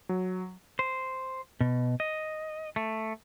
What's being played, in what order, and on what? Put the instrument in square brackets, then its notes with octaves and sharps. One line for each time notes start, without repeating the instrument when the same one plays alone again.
[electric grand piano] F#3
[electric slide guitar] C5
B2
D#5
A3